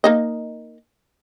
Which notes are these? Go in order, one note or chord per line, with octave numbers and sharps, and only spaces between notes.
A#3 D#4 D#5